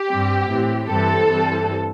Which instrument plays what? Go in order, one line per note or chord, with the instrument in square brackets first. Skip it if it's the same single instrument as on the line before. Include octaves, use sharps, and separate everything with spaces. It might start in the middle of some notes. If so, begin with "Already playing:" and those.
Already playing: [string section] G4
G2 G3 C4
A2 E3 C4
G2 E3 G3 C4 A4
G2 E3 G3 C4